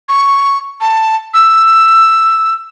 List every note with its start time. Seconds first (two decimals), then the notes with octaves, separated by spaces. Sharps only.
0.09 C#6
0.81 A5
1.34 E6